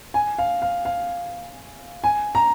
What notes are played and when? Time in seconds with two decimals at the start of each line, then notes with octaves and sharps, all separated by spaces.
0.14 G#5
0.38 F5
0.62 F5
0.85 F5
2.04 G#5
2.35 A#5